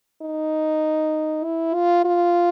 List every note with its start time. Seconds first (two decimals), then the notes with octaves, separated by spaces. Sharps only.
0.22 D#4
1.44 E4
1.74 F4
2.05 F4